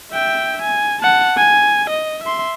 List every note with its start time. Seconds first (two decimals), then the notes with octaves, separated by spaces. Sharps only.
0.12 E5 G5
0.62 G#5
1.02 F#5 A5
1.37 G#5
1.90 D#5
2.24 E5 C6